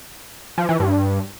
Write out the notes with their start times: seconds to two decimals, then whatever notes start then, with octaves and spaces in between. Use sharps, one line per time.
0.58 F3
0.69 E3
0.80 G2